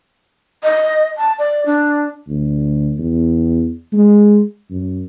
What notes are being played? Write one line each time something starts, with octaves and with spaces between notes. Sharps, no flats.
D#5
A5
D5
D4
D2
E2
G#3
F#2